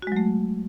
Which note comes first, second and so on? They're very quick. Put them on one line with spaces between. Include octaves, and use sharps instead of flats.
F#4 G#3 F#3 A3